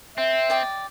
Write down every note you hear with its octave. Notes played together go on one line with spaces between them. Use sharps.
C4 E5
D5 D#5 G5